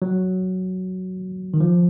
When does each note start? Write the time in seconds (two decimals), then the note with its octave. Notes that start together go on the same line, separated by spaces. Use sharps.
0.02 F#3
1.54 D#3
1.60 F3